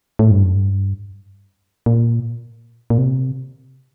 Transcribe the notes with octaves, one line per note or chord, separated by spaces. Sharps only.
A2
G2
F#2
G2
A#2
A#2
C3